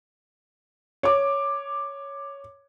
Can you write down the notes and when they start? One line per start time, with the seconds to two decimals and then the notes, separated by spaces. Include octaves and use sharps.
1.03 C#5 D6